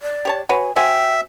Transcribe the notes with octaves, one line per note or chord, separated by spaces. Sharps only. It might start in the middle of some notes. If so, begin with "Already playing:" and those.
D5
G4 C#5 A5
F#4 B4 C#5 G#5
F#4 C5 E5 G5 G#5